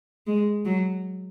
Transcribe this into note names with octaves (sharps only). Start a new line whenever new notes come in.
G#3
F#3